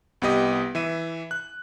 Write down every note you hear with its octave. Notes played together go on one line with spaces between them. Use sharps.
C2 B3 G4 D#5 D#6
E3 E5 D#7
F#6